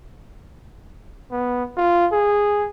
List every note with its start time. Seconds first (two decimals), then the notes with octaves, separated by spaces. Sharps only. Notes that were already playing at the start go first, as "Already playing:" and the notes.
1.31 B3
1.77 F4
2.12 G#4